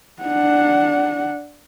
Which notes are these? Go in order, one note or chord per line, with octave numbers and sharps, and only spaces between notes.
D4 F#5